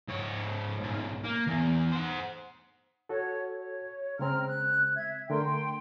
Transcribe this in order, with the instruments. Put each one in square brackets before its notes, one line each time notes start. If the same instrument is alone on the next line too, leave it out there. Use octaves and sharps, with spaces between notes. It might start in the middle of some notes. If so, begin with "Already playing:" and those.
[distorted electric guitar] G#2 C#5
B1 G#2
A#3
E2
C5 F#5
[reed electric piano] F#4 A4 [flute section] C#5
[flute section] C#5
[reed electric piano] C#3 G#3 C4 [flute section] A#5 F6
[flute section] F#6
E5 G#6
[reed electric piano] D3 A3 A#4 [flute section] G5 C6